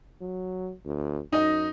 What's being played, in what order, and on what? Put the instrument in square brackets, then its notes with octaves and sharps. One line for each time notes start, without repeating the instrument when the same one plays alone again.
[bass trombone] F#3
D2
[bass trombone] F#2 [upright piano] D#4 D#5